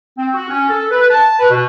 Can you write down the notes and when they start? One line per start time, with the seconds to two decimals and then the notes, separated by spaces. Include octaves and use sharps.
0.17 C4
0.32 F#4
0.49 C#4
0.69 A4
0.90 B4
1.10 A5
1.37 B4
1.50 B2